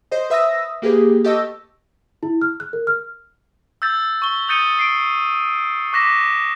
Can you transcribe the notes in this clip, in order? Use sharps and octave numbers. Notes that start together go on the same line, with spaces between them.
C5 D#5
B4 E5 D#6 E6 A#6
A#3 G4 G#4 B4
G4 A4 D#5 C#6 E6 A#6
E4
F6
F#6
A#4
F6
E6 G6 A6
C#6 G7
D#6 G6 A6 C#7 D#7 G7
C7 D7
C#6 D6 F#6 A#6 B6 E7